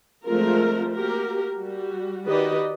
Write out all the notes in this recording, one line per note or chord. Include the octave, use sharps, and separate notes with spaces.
F3 G#3 A3 C4 F4 A#4
A#3 F#4 G4 A#4
G3 F#4
D#3 F#4 G4 B4 D5 D#5